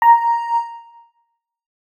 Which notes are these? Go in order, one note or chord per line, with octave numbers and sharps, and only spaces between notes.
A#5